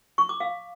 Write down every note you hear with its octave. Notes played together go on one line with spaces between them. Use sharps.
C#6
D6
F5